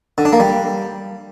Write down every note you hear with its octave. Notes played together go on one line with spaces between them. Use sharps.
D3
D4
A#3
G3